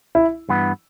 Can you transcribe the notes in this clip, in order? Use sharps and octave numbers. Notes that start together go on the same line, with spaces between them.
E4
G2 E3 B3